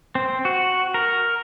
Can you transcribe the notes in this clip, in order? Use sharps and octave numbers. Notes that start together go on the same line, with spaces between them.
C4
F#4
A#4